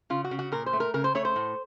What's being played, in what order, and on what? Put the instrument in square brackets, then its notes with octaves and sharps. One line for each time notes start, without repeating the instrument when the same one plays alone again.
[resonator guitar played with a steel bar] C#3 F4
F#4
C#3
F#4
A#2 A#4
C5
A3
A#4
C#3 A#4
C5
A3 C#5
C5
A2